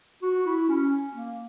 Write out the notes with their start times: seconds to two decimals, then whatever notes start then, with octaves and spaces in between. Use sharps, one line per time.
0.22 F#4
0.46 E4
0.69 C#4
1.14 A#3